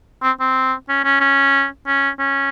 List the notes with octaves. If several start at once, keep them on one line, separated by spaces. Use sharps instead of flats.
C4
C4
C#4
C#4
C#4
C#4
C#4